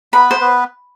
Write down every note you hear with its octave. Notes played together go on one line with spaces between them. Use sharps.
B3 B4 B5
C5
B3 B4